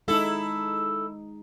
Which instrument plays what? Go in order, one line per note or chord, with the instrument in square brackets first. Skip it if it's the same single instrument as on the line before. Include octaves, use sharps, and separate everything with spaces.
[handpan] G#3 D#4 [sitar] E4 A4